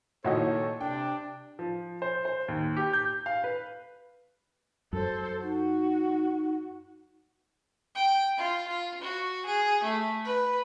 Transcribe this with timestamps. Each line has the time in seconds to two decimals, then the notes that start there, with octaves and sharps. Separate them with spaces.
0.24 A#2 D#3 F#3 E4 F#4 A4 C#5 D#5
0.81 C3 D4 G5
1.59 F3
2.02 C5
2.25 C5
2.48 D#2
2.77 G4
2.93 G6
3.26 F5
3.44 B4
4.93 F#2 A4 C5
5.43 D#4 F#4
7.95 G5
8.37 F4
8.67 F4
9.01 F#4
9.46 G#4
9.83 A3
10.24 B4